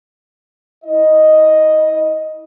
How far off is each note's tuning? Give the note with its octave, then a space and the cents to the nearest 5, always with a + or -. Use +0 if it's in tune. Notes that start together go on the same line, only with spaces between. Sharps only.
E4 -40 D#5 +0